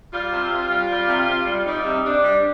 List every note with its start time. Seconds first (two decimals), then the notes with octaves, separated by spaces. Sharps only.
0.12 G3 F4
0.31 C3
0.50 C3
0.69 G3
0.89 G3
1.08 C3
1.27 C3
1.47 G3
1.66 G3 D#4
1.85 C3
2.04 C3 D4
2.24 G3